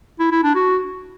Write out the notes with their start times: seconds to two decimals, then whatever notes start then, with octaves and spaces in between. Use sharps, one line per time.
0.20 E4
0.32 E4
0.43 D4
0.55 F#4